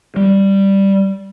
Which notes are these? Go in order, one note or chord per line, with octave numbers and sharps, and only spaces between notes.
G3